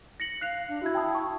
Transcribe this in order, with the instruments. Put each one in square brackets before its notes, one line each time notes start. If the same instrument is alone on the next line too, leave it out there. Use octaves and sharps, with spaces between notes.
[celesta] A#6 C#7 F#7
[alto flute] F5 [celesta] F#6 C7 F7
[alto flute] D4
[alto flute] E4 [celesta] F#4 G#6
[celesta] G5 A5 D#6
A5 C#6